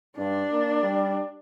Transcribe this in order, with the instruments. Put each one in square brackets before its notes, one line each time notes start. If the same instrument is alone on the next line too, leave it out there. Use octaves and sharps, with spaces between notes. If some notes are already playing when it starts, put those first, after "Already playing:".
[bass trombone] G2 [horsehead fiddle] D4
[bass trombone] A#3
G3